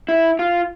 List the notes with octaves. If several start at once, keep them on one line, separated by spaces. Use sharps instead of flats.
E4
F4